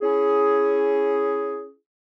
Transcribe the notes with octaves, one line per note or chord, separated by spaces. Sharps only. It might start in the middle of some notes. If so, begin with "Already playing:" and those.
C#4 E4 G#4